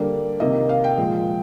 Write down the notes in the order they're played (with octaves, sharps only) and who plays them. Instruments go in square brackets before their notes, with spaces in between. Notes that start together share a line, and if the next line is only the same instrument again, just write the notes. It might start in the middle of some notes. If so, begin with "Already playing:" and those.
Already playing: [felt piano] D3 G3 A#3 D5
C3 D#3 A#3 D#5
F5
G5
A#2 F3 G#3